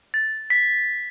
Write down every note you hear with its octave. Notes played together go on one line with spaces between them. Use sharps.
A6
B6